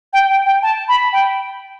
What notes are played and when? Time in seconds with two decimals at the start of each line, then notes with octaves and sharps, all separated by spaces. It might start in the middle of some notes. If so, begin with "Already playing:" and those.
0.13 G5
0.30 G5
0.46 G5
0.62 A5
0.88 B5
1.13 G5